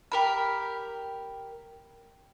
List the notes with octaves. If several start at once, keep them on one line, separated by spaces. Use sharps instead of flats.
G4 A#4 B5